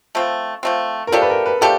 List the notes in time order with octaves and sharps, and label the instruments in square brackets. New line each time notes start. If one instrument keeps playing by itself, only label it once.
[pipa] F3 A3 C4
F3 A3 C4
[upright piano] A#4
[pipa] F3 A3 D4 G4 [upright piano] A4
[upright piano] B4
A#4
B4
[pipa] F3 A3 D4 G4 [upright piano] A4